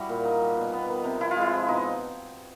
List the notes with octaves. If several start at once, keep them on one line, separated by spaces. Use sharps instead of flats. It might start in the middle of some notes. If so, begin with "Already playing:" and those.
Already playing: G3 E4 F#4
A#2
D#4
G3
B2
B3
D#3
C3
F3 E4
F4
G#3
E4
F3
B2 D#4